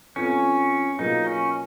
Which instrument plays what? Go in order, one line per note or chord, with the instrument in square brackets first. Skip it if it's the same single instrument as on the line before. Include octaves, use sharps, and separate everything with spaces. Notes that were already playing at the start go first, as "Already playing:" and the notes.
[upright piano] F2 F3 B3 [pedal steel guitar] C#4
[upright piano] B2 F#3 A#3 F4 G#4 [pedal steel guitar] D#4
[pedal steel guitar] C#4